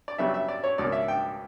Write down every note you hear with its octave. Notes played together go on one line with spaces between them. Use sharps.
D5
F#2 C#3 G3 B3 E5
E5
D5
C#5
C#2 B2 A#3 C#4 D5
E5
G5